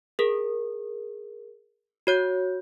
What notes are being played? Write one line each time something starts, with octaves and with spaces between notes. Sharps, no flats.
G#4 A#4
F#4 C#5 G6